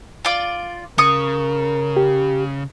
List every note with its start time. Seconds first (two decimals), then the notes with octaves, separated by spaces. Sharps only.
0.25 F4 D5
0.98 C#3 A#4 C#6 D#6
1.97 G4